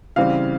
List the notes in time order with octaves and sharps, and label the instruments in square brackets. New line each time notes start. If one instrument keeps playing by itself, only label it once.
[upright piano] C#3 E3 G3 C4 F5